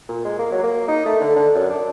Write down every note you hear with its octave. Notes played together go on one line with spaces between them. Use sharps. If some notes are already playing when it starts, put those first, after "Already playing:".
A#2
G#3
A#3
F#3
A#3
D#4
A3
D3
D3
F#2
D4